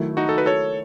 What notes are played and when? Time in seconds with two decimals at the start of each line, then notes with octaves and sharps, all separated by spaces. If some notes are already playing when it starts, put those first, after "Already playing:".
Already playing: D#3 F#3 A3 E4
0.17 D#4 F#4
0.29 A4
0.38 B4
0.46 A4 C#5